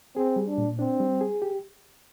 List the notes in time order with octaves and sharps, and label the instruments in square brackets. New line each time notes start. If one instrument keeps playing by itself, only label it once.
[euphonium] C4 [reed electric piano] G#4
[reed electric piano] G3
[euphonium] D4
[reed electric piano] A#2
[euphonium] C4 [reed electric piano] D4
[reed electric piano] G3
G#4
G4